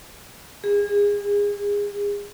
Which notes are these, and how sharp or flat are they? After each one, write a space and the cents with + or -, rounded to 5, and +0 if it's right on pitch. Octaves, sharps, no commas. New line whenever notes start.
G#4 -30